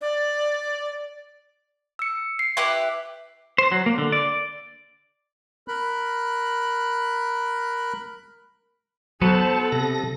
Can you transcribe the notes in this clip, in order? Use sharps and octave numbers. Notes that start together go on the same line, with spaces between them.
D5
E6 C#7
C7
E4 G4 B4
C5
F#3
A#3
D3
D5
A#4 B5 F#6
F#3 B3 A4 C5 A5
C3 A#6